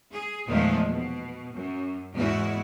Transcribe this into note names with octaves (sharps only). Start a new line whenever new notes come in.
G#4
E2 A#2 D#3 F3 G#3 A3
B2
F#2
E2 G#2 E4 F#4